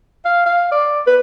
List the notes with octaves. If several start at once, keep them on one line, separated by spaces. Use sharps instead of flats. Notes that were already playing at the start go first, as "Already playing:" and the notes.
F5
F5
D5
B4